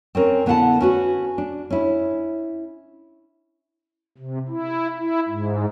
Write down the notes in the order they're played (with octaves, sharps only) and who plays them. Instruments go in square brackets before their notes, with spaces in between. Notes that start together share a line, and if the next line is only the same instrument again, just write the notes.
[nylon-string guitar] C4 C#4 A#4
D3 B3 E4 F5 F#5 A5
C#4 F#4 B4
D4
C#4 E4
[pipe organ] C3
E4
E4
G#2